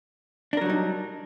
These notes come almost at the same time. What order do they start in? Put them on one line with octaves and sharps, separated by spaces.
D4 A#4 F#3 G3 D#4